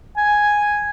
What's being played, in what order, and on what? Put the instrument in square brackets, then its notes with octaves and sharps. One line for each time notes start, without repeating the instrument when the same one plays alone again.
[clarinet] G#5